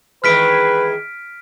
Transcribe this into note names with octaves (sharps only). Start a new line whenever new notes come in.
D#3 E3 G#3 B4 F6 B6 D7